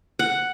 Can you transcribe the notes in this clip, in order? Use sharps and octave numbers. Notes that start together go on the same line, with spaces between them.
F#5